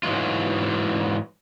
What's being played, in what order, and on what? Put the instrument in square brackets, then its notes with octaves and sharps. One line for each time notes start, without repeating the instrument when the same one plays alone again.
[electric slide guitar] G#2 E3 F#3 G#3 F4